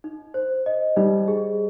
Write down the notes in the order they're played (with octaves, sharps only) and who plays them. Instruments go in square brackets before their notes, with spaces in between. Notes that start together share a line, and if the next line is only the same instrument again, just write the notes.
[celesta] D#4
C5
D#5
[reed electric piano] G3 [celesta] D#4
[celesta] G#4